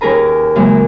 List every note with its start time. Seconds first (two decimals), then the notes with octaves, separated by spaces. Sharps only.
0.01 D#2 C#4 G#4 A#4 B4 A#5
0.55 F#2 C#3 E3 G#3 A#3